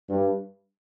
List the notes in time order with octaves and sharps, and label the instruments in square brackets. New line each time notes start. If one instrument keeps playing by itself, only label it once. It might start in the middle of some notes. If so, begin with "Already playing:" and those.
[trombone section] G2